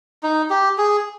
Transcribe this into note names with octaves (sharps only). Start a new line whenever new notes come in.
D#4
G4
G#4